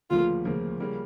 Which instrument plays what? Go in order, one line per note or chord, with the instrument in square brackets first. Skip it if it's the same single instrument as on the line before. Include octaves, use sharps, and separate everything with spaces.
[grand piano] D2 C#3 F3 A#3 [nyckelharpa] F4
[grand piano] D2 C#3 F3 A#3
C#3 G3 A#3